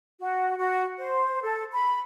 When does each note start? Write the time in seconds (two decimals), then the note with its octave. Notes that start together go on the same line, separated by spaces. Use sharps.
0.20 F#4
0.57 F#4
0.99 C5
1.43 A4
1.73 B5